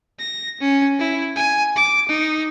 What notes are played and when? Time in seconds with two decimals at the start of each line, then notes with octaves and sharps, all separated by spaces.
0.19 A#6
0.60 C#4
0.99 E4
1.36 G#5
1.76 D6
2.09 D#4